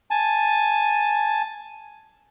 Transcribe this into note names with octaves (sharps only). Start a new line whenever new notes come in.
G#5 A5